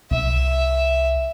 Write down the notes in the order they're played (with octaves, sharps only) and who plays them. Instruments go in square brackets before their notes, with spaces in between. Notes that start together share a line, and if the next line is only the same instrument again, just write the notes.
[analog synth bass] C2 [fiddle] E5